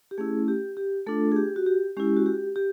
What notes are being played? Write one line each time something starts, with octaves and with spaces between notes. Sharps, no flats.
G4
A3 C#4 E4 G#4
G4
G4
A3 D4 F4 A4
G#4
G4
F#4
G4
G#3 C#4 E4 G4
F#4
G4
G4